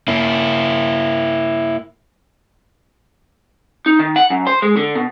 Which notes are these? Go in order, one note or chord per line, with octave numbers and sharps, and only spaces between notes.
A#3 E4
D#4
D#3
F#5
F#2
C5
G#3
D3
B2